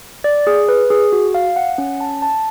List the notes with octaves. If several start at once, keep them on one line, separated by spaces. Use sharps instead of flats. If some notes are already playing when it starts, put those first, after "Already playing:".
D5
G#4
B4
G#4
F#4
F5
F#5
C#4
A5
A5